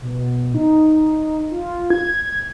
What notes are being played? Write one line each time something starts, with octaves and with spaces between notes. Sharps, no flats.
B2
D#4
F4
G#6